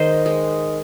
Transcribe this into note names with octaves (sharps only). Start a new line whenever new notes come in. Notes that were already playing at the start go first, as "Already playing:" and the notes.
Already playing: D#3 G#3 C5 D#5
G#3